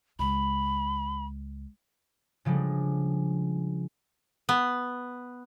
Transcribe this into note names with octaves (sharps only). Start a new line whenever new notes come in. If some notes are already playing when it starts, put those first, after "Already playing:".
C#2 B5
C#3 F3 G3 G#3 D4
B3